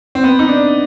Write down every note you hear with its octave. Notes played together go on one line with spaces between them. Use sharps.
C4
B3
D#4
D4